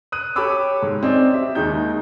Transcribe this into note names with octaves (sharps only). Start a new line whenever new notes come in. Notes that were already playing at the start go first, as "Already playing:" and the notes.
D#6 F#6 D#7
G4 A4 C#5 B5 D6 E6
G#2
C4 C#4 D5 D#5
G4 E5
D#2 D#3 G#3 D#4 G6